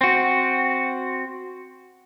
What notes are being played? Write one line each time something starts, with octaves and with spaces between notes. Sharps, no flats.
C4 F#4